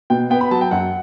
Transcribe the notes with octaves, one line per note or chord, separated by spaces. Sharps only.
B2 G5
B3 G5
B5
F#3 A5
G5
F#2 F#5